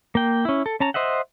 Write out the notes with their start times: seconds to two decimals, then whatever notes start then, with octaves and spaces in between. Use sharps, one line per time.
0.15 A#3 G5
0.45 C#4 E4
0.66 A4
0.80 C#4 A5 A#5
0.94 C5 D#5 E5 F#5